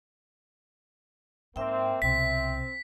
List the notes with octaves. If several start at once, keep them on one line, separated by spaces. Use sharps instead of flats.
G#2 A#3 C4 E5 G5
C2 B2 C4 B6